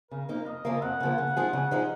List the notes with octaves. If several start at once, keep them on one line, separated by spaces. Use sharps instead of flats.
C#3 A#4
F3 A#3 D#4
F2 D#5
C#3 F3 A#3
F2 F#5
C#3 F3 A#3
C#3
F3 G#3 D#4 G#4
C#3
F3 G#3 D#4 G#4